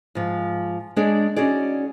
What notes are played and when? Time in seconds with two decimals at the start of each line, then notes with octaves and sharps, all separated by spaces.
0.15 G#2 F3
0.96 G#3 D4 G#4 C#5 D5
1.36 C#4 D#4 F#4 G#4 D5